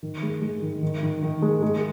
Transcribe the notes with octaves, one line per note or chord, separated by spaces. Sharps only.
D#3
G#3
G#3
D#3
D#3
D#3
D#3
G#3
G#3